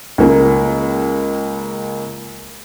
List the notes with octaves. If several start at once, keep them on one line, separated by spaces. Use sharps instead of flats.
C#2 A#3